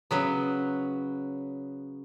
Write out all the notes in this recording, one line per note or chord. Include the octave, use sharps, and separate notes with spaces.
C#3 F#3 B3